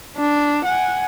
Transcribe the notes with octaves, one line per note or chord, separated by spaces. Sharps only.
D4
F#5 G#5